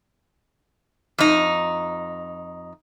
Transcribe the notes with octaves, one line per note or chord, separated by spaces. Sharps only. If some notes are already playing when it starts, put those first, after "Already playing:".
F2 D#4